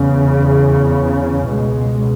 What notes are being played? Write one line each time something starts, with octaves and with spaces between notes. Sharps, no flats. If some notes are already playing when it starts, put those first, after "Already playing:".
Already playing: E2 C#3
C#2 B2 G#3